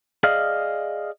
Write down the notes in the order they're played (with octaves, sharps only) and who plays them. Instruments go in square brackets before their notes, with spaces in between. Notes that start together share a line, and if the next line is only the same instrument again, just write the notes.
[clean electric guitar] G#4 D5 D#5 F5